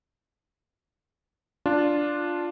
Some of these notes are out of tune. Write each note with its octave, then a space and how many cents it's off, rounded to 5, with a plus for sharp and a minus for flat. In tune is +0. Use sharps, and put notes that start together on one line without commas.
D4 +0 F4 +0